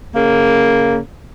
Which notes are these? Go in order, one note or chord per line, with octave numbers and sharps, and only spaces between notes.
C#3 A#3